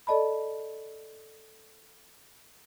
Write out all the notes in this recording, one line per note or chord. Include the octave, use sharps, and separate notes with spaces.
A4 D5 D#5 A5 B5